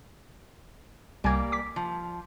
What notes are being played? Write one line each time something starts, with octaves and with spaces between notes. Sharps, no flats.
C2 G3 A#3 G#5 G#6
D6 B6
F3